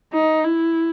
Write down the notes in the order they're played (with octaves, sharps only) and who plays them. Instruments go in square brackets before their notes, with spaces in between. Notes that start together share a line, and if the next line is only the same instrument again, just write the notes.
[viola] D#4
E4